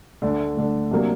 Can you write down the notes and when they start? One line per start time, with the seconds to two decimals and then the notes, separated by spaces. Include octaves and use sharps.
0.22 D2 D3 A3 D4
0.57 D2 D3 A3 D4
0.91 C3 F#3 A#3 D4